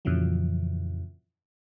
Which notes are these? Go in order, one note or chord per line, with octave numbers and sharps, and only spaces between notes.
F2 A#2 C#3 E3 F#3